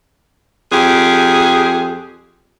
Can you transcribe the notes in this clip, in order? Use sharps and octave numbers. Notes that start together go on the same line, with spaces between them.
F2 G4 G#4